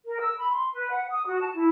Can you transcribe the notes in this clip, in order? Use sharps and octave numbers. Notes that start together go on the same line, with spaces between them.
A#4
E6
B5
C6
B4
F#5
D#6
F#4
A5
E4